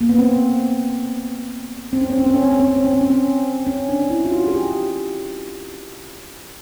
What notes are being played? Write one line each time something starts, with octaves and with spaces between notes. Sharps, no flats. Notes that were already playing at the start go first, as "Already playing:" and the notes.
A#3
B3
C4
C4
C#4
C4
C#4
C4
C#4
C4
C#4
C4
C#4
C4
C#4
C4
C#4
C4
C#4
D4
E4
F4
F#4
G#4
G4